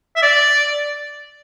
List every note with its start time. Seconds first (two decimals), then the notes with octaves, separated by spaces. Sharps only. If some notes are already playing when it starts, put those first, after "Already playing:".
0.16 E5
0.22 D5